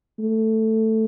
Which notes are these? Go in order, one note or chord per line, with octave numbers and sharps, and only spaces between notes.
A3